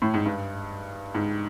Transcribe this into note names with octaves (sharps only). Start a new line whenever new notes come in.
A2
G#2
G2
G#2